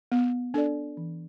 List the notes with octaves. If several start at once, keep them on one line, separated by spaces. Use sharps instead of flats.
B3
D4 A4 D5
E3